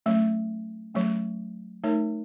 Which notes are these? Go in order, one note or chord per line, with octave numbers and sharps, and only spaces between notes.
F#3 A3 C#4
F#3 A3 C#4
A3 D#4 A#4 C#5